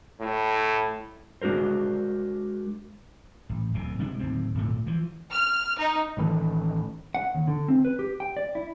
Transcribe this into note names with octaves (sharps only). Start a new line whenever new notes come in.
A2
G#3 D4 F#4 A#4 C5
A1
D1 D2 B2
C3 G#3 C4 D4
D1 D#2 A2 C4
D1 G#1 A#2 A3
E3 F3
F6
D#4
A1 D#3 E3 A3
F#5
D#2
D3
C4
B4
G4
G5
D5
E4